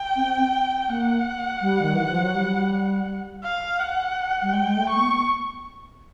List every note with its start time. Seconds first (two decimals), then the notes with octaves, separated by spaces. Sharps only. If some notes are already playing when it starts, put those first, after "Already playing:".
Already playing: G5
0.16 C4
0.89 A#3 F#5
1.61 G3
1.82 D#3
1.95 E3
2.08 F3
2.22 F#3
2.35 G3
3.43 F5
3.80 F#5
4.42 G3
4.53 G#3 G5
4.66 G#3
4.76 A3
4.90 C#6
4.95 A#3
5.01 B3